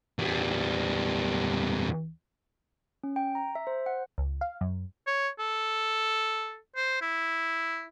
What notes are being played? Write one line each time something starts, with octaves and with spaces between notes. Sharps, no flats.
E2 G3
C#4
G5
A#5
E5
C5
F#5
C#2
F5
F#2
C#5
A4
C5
E4